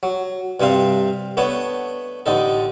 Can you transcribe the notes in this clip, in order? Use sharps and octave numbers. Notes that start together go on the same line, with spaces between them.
F#3
G2 C3 C4 D4 F5
A3 B3 D4 C#5
A1 D3 D#4 A4